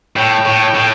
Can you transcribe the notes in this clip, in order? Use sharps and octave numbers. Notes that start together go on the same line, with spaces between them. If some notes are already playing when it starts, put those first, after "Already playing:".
A2 G5
A2
A2